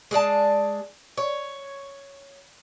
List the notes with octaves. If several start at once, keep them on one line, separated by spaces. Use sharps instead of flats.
G#3 G#4 D5 A5
C#5